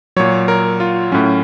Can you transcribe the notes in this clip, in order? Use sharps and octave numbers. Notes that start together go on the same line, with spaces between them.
A#2 F#3 C#5
A#4
F4
A2 F#3 C#4